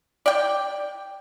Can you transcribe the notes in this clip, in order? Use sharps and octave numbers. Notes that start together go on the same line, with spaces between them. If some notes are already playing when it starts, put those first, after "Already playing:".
D5 G5